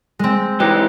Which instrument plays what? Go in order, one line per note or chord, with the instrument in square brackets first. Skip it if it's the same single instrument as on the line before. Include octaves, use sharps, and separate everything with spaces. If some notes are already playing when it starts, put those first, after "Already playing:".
[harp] G#3 C4
[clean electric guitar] E3 G4 [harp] D#4